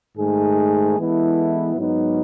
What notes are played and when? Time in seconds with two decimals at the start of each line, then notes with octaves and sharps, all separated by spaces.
0.17 G#2 D#3 A3 D#4 G#4
0.97 E3 G#3 B3 E4 A4
1.76 G#2 F#3 B3 D#4